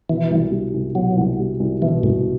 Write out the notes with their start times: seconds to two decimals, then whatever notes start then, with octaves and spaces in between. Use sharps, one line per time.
0.09 B2 E3
0.30 C2
0.52 G3
0.74 C2
0.95 B2 F#3
1.17 C2
1.39 G3
1.60 C2
1.82 B2 E3
2.03 C2 A2